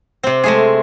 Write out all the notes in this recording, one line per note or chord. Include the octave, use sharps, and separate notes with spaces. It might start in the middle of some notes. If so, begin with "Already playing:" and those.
C3 C4
G#3 A3 G#4